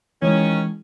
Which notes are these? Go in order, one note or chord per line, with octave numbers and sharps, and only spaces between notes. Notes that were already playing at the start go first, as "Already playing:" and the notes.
D#3 E3 G#3 C#4